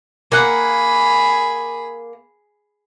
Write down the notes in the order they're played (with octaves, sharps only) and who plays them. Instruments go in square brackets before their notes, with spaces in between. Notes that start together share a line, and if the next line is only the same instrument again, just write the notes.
[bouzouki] A#3 F#5 [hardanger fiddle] G#4 B5